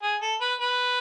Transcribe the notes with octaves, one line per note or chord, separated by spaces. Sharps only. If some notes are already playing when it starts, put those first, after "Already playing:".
G#4
A4
B4
B4